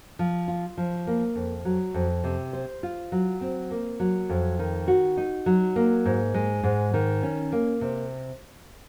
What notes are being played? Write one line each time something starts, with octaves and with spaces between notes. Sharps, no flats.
F3
F4
F3
A#3
F2
F#3
F2
C3
C5
F4
F#3
C4
A#3
F#3
F2
D#3
F#4
D#4
F#3
A#3
G#2
G#3
G#2
D#3
C#4
A#3
C3